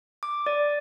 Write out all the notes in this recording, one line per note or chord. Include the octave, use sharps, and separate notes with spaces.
D6
D5